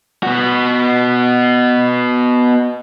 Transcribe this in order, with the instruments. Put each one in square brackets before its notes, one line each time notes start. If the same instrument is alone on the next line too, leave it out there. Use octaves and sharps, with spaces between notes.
[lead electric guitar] B3 F#4